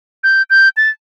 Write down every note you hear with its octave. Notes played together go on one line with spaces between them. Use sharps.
G6
G6
A6